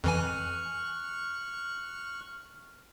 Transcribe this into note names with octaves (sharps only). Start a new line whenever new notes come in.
F2 E3 G#5 C#6 F6 F#6